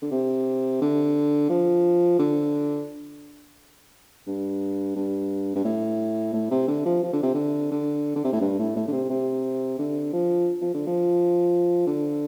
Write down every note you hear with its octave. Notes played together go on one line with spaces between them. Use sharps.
D3
C3
D3
F3
D3
G2
G2
G2
A2
A2
C3
D3
F3
F3
D3
C3
D3
D3
D3
C3
A2
G2
A2
A2
D3
C3
C3
D3
F3
F3
D3
F3
D3